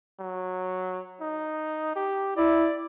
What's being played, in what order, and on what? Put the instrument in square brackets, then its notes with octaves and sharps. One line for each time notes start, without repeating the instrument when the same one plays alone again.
[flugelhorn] F#3
D#4
G4
[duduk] E4 [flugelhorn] D5